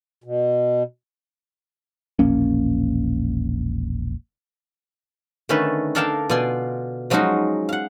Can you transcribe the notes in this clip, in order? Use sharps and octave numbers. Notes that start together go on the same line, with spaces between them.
B2
E1 A#1 A#3 C#4
D3 D#3 A3 C#4 A4 B4
D4 A4 A#4 F5 G5 A5
B2 F4 D5 G#5 C6
F3 F#3 G#3 C#4 D#4 F#4
F5 F#5